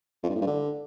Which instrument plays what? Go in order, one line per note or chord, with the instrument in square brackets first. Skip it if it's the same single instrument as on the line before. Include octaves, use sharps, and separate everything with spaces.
[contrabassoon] F2
G2
A2
G2
D3